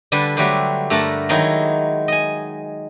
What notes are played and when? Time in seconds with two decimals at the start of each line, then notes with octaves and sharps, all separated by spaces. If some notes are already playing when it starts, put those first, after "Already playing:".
0.12 D3 G3 G4 B4 A5
0.36 F#3 G3 A3 G4 B4 C5
0.90 G2 A3 A#4 F#5 A5
1.29 D#3 F#3 G#3 D#4 E4
2.08 D#5 G#5